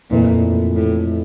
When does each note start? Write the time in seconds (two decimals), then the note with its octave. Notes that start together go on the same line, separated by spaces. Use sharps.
0.10 F2 A#2 E3 A3 E4
0.75 A2